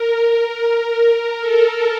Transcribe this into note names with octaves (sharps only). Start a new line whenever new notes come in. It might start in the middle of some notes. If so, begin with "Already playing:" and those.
Already playing: A#4
A4